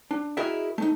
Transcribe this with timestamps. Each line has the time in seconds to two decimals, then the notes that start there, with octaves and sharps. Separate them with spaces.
0.11 D4
0.37 E4 F#4 G#4 A#4 D#5 E5
0.78 A3 D#4